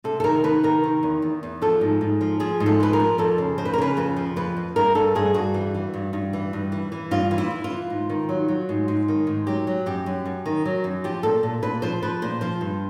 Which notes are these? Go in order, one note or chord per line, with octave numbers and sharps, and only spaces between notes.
C3 A4
A4
D#3 A#4
D#3 B4
C3 A#4
D#3
E2
E2
E2
F3 A4
G#2
G#2
F3
F3 G#4
G#2
A4
F3 B4
A#4
F3
F2 A4
C#3
F2 C5
B4
A#4
C#3 B4
F2 C5
F3
F2 B4
F2
G2 A#4
G2 A4
G2 G#4
G2 F#4
E3
E3
G2
G2
E3
G2
E3
E3
G2 F4
E3
E4
E3
F4
E3
G#2
D#3
F#3
F#3
G#2
G#2
D#3
G#2
F#3 G4
F#3
F#2 G4
F#2
F#2
D#3
F#3
F#2
F3 G4
A#2 A4
A#2
A#2 B4
F3 C5
F3 B4
A#2 C5
F3 C5
G2